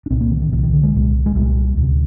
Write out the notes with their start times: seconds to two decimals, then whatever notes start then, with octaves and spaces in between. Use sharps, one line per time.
0.06 D4
0.11 C2 A#2 C4
0.21 A#3
0.31 D#3
0.42 D#3
0.52 C2 A#2 D#3
0.63 D#3
0.73 D3
0.83 G#3
0.94 C2 A#2
1.26 G#3
1.35 C2 A#2 G3
1.77 D2 C3